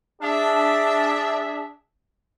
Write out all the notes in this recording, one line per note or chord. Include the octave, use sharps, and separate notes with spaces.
D4 G#4 E5